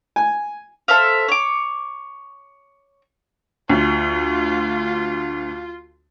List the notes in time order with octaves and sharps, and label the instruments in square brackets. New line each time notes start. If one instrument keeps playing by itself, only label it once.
[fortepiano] G#5
[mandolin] A4 C5 E5 F5
C#5 D6
[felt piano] D2 [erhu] F4